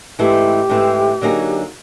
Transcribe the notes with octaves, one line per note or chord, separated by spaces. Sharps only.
G#2 E3 A3 C4 E4 G4
G#2 E3 A3 C4 E4
D3 F#3 A#3 D#4 G#4